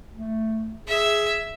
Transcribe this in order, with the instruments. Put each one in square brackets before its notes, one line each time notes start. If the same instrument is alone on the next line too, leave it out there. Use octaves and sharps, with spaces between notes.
[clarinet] A3
[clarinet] G#4 [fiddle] E5